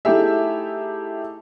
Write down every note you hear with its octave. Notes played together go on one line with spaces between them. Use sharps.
A3 D#4 E4 G4 G#4 E5